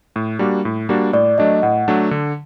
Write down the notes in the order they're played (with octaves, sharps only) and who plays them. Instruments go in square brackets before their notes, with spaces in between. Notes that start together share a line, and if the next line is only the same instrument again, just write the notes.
[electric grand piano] A2
G3 A#3 D4 F#4
A2
G3 A#3 D4 F#4
[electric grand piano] A2 [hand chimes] D5
[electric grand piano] F#3 A3 D4 [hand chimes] D#5
[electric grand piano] A2 [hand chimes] F#5
[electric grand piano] F#3 A3 D4
D3